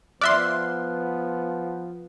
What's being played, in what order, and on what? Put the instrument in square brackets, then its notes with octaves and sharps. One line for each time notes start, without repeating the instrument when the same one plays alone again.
[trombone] F3 [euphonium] B3 [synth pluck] D5 E5 C6 [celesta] F6 F#6